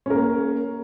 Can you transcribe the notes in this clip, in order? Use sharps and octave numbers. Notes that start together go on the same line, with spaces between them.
A#3 C#4 A#4